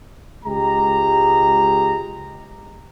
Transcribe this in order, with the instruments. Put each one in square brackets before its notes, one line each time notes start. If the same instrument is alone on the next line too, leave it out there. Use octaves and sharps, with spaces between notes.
[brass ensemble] C#2 G#3 G4 A#5